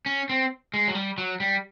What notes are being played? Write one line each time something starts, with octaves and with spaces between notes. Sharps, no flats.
C#4
C4
G#3
F#3
G3
F#3
G3